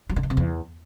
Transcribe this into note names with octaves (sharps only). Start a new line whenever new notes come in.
F#3
D3
D#3
C3
E2